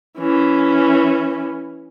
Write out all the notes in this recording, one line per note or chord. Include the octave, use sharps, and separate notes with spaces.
E3 C#4